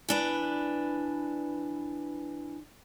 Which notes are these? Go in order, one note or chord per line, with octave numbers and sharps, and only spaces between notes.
E3 D4 B4